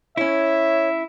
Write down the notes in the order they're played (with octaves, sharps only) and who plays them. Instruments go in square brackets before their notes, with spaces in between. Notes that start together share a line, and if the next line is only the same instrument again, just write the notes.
[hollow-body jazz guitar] C#4 E4 [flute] C#5 [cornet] E5